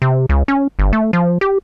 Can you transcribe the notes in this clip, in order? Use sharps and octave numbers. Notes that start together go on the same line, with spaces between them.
C3
C#2
C#4
G1
A3
F3
G4